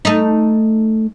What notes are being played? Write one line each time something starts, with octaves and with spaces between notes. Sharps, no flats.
A3 D#4